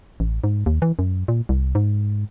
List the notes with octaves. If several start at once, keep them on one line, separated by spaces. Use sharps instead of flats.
A1
G#2
D#2
E3
F#2
A#2
C2
G#2